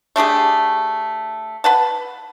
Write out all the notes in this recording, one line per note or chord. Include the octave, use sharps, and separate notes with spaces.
A3 D4 G4 G#4
B4 F#5 A5